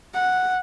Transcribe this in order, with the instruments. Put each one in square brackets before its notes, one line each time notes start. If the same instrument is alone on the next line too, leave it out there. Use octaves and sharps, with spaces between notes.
[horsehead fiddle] F#5